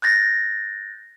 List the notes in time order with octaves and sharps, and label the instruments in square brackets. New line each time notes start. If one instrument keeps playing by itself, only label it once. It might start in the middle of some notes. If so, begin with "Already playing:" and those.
[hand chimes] F#6 G6 A6 A#6